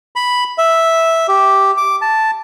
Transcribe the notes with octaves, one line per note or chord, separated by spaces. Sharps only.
B5
E5
G4
D6
A5